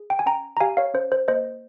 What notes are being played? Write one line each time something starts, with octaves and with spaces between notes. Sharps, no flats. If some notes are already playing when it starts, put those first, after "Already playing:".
Already playing: G#4
G5
G#5
C#4 G5 A#5
A#5
G4 F5 G#5
C#5 F5
C#4 C5
C5
A#3 C5 D#5